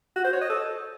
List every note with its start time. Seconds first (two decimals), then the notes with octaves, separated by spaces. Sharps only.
0.16 F#4
0.24 C5
0.33 C#5
0.41 D#5
0.50 A4